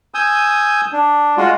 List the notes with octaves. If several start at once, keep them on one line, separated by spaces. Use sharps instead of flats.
G#5 D#6 E6 G6
D4
G#3 F4 F#4